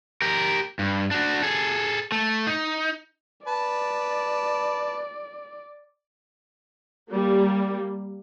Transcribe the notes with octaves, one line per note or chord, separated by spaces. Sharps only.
G4 A#4
G2
D4 F#4
G#4 A4
A3
D#4
B4 D5 A5
G3 A#3